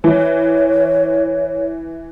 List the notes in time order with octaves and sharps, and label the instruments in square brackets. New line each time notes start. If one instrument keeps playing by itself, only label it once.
[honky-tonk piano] E3 [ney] C#5